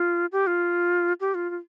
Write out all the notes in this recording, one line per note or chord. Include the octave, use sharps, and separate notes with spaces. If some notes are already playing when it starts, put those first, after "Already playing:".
Already playing: F4
G4
F4
G4
F4
F4